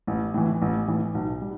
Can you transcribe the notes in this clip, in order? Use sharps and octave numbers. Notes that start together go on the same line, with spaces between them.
A1
A2 E3
A1
A2 E3
B1
G3